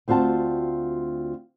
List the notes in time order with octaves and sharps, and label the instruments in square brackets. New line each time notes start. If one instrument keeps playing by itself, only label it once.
[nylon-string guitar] D2 C4 F4 F#4 A5